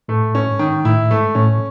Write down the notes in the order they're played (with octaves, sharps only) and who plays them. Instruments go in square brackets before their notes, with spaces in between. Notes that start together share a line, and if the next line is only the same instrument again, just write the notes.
[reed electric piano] A2 [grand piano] A3
[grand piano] C#4
[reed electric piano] G#2
[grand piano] D#3
[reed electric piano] A2 [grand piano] E4
[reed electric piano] G#2 [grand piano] A3
[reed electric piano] A2 [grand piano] C#4